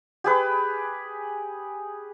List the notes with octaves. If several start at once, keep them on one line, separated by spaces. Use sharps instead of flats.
G4 G#4 B4